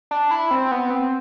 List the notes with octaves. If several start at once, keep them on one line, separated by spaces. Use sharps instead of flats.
D4
E4
C4
B3
C4